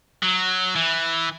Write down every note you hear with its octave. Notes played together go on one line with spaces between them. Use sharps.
F#3
E3